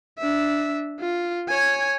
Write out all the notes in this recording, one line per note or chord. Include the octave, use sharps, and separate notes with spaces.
D4 E5
F4
C#5 G#5